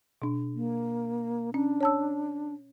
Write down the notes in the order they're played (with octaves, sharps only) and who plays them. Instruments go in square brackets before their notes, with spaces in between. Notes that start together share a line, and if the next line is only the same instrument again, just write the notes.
[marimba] B2 D4
[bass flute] A#3
[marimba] C#4 [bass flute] D4
[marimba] C#5 A5 E6